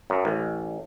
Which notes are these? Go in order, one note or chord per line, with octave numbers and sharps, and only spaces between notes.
F#2
A1